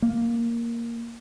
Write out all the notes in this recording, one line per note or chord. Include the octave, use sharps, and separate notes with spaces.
A#3